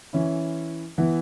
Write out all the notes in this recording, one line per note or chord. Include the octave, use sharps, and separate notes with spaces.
E3 C#4 E4
E3 B3 E4